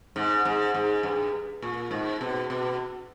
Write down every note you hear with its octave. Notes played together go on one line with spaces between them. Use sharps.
G#2
G#2
G#2
G2
A#2
G#2
B2
B2